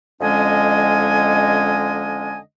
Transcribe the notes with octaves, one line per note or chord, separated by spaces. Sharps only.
F2 D3 G#3 C#4 D#5 G#5